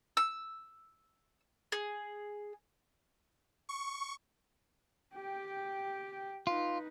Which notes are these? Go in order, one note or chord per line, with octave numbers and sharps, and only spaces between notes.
E6
G#4
C#6
G4 G5
D#4 F4 B4